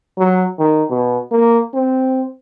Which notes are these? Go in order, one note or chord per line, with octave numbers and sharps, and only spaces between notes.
F#3
D#3
B2
A#3
C4